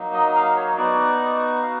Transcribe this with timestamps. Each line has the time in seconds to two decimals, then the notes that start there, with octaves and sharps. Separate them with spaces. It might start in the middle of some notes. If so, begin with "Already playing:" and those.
Already playing: F#3 A#3 D#4
0.13 D#5
0.35 F5
0.57 C#5
0.77 B3 D#4 F#4 D5
1.63 F5